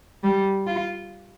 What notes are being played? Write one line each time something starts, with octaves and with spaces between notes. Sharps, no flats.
G3
F4